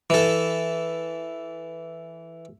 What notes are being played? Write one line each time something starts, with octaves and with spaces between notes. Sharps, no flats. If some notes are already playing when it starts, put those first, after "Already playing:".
E3 A4